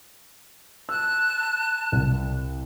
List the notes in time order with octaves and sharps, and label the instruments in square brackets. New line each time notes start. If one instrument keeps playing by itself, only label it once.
[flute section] A5 F#6 [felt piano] E6
[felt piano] C2